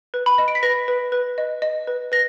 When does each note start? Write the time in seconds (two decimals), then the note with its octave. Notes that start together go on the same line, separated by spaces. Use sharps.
0.14 B4
0.26 B5
0.38 D#5
0.48 D7
0.55 B6
0.63 B4 A#6
0.88 B4
1.12 B4
1.38 D#5
1.62 D#5
1.87 B4
2.12 B4 A#6